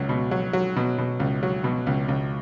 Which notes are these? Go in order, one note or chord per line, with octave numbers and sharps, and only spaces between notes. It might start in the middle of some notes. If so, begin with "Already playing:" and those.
Already playing: C#2 F#3
B2
F#3
F#3
B2
B2
C#2
F#3
B2
C#2
C#2